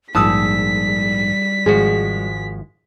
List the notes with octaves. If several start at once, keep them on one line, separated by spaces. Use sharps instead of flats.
A#1 G#2 G3 A5 D#6 E6 B6
G#1 F3 G#3 F#4